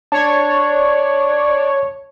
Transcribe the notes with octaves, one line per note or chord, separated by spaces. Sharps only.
D4 C#5 A5